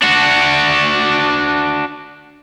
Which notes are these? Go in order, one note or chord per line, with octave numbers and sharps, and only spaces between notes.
D4 F#4